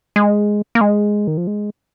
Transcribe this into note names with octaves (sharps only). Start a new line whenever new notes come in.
G#3
A#3
G#3
D#3
F3
G#3